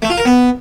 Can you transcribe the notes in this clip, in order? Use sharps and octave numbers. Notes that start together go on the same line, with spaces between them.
A3
F4
A#4
B3